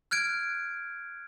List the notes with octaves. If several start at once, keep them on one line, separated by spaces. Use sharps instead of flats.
F6 F#6 G#6 D7